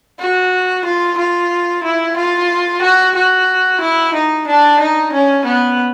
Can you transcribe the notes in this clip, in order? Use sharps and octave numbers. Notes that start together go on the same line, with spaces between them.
F#4
F4
F4
E4
F4
F#4
F#4
E4
D#4
D4
D#4
C#4
B3